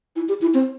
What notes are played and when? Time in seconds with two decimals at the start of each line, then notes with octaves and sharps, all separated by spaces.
0.16 E4
0.29 G4
0.41 E4
0.54 C4